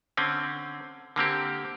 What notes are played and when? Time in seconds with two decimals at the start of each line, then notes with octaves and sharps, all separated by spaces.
0.17 D3 C4 C#4
1.16 D3 A#3 C4 G4